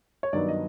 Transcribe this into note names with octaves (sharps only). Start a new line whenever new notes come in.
C#5
G2 D#3 F#3 B3 D#4 D5
D#5